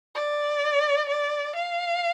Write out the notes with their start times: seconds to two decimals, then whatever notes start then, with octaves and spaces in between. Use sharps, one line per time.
0.15 D5
1.09 D5
1.55 F5